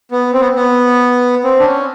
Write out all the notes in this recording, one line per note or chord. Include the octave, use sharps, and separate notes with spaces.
B3
C4
B3
B3
C4
D4
C#4